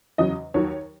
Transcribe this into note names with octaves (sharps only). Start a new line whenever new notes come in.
E2 C#3 F#3 D#5
D#2 D#3 F#3 C#5